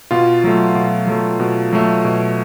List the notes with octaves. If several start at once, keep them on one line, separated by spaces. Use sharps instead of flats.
B2 F4
F#3 A3
B2
F#3 A3
B2
F#3 A3
B2